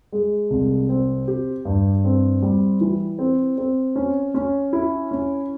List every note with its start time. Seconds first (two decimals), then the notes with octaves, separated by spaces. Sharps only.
0.12 G#3
0.50 C2
0.89 C4
1.28 G4
1.65 G2
2.04 C4
2.42 G3
2.81 E3
3.19 C4
3.58 C4
3.96 C#4
4.34 C#4
4.73 E4
5.11 C#4